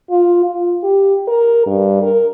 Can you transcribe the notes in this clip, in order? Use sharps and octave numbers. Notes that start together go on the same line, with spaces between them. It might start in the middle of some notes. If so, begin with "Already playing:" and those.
F4
F4
G4
A#4
G2
A#4